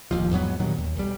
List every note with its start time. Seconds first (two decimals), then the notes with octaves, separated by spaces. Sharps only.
0.11 D1 D#2 F3
0.31 E2 G#2 F#3 B3
0.60 G2 A#2 D#3 F#3
0.78 D#2
0.96 B1 G3